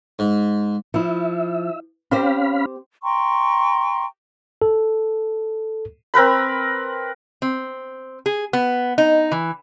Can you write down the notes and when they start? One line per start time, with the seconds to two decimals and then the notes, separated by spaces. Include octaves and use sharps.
0.19 G#2
0.94 F3 E4 E5
2.11 C4 C#4 G4 C5 F5 B5
3.03 G5 A#5 C6 C#6
4.62 A4
6.14 C4 A#4 B4 B5
7.42 C4
8.26 G#4
8.53 B3
8.98 D#4
9.32 E3